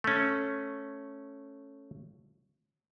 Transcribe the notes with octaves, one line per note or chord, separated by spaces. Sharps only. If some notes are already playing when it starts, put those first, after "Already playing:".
A3 C#4